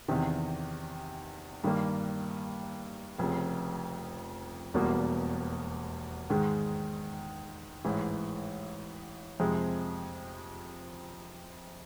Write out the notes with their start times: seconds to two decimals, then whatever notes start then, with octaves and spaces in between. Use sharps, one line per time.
0.08 E2 C3 D#3
1.64 G2 D#3 G3 A#3
3.19 F1 F2 C#3
4.74 E1 E2 B2 G3 A#3
6.30 G#2 D#3 G#3
7.85 A1 G#2 E3
9.40 F2 C3 F3 G#3